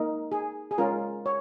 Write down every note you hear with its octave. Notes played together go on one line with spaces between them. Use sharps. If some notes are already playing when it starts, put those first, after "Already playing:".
Already playing: A#3 D#4 A#4
G#4
G#4
G#3 C#4 F4 A#4
C#5